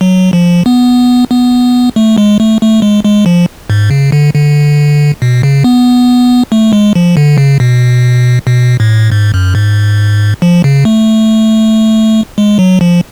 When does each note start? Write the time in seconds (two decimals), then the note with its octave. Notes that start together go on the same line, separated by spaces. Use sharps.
0.01 F#3
0.33 F3
0.66 B3
1.31 B3
1.96 A3
2.18 G#3
2.40 A3
2.61 A3
2.82 G#3
3.05 G#3
3.26 F3
3.70 G#2
3.91 C#3
4.12 D3
4.34 D3
5.22 B2
5.43 C#3
5.64 B3
6.52 A3
6.73 G#3
6.95 F3
7.17 D3
7.38 C#3
7.60 B2
8.47 B2
8.80 A2
9.12 G#2
9.34 F#2
9.55 G#2
10.42 F3
10.64 C#3
10.85 A3
12.38 G#3
12.59 F#3
12.81 F3